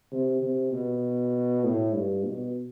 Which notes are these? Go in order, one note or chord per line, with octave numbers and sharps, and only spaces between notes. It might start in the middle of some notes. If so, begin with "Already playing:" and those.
C3
C3
B2
A2
G2
B2